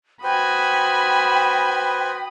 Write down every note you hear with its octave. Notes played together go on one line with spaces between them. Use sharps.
F#4 B4 C5 G5 G#5 B5 D#6